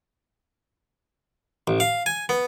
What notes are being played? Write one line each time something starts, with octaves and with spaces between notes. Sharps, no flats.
A1
F5
G#5
B3